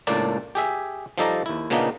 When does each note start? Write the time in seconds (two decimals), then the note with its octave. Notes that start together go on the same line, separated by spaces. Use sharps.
0.07 C#2 A2 A#3 D4 D5 A5
0.55 G4 G#4 E5
1.18 F3 G3 D#4 A4 D5 A#5
1.46 D#2 E4
1.70 A#2 C#3 A#3 B3 D4 D#4